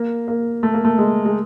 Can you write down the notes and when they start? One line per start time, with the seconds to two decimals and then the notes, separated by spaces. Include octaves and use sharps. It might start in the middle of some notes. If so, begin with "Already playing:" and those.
Already playing: A#3
0.28 A#3
0.63 A3
0.74 A#3
0.85 A3
0.98 G#3
1.25 G#3